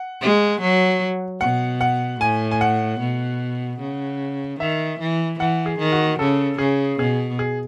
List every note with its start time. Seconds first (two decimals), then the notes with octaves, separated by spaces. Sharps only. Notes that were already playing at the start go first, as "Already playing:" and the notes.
Already playing: F#5
0.21 G#3
0.61 F#3
1.41 B2 F#5
1.81 F#5
2.20 A2 G#5
2.51 G#5
2.61 F#5
3.00 B2
3.80 C#3
4.60 D#3 E5
5.00 E3
5.39 E3 F#5
5.66 G#4
5.79 D#3
5.92 F#4
6.19 C#3 A4
6.58 C#3 G#4
6.99 B2 G#4
7.39 G#4